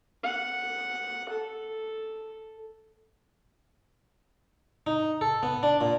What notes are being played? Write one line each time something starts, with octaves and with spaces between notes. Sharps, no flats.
F#5
A4
D#4
A4
B3
D4
A#2